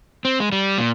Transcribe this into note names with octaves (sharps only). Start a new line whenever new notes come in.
C4
G#3
G3
A#2